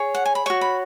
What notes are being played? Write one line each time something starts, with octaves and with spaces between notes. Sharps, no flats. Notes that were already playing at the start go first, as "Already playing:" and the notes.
Already playing: G#4 C#5
F#5
G#5
B5
F#4 C#5 C#6
B5